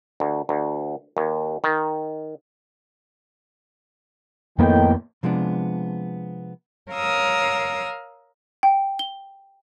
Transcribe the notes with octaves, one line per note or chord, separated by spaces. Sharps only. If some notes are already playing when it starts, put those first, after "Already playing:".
D2
D2
D#2
D#3
F2 A2 D#3 A#3 B3 G5
C3 F3 G#3 B3 D4
A#4 C#5 F5 A#5 D#6 E6
G5
G7